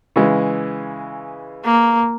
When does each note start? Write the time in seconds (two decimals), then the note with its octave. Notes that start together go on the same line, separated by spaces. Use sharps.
0.16 C#3 E3 G#3
1.65 A#3